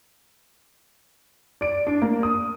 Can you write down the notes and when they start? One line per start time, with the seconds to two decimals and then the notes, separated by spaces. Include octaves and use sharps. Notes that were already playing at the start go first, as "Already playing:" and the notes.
1.61 D5 D7
1.87 D4
2.02 A#3
2.23 D#6